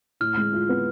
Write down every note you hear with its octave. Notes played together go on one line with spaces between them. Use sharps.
A2 F6
G#3
F4
B3